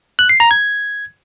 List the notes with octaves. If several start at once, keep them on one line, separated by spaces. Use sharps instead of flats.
F#6
C7
A#5
G#6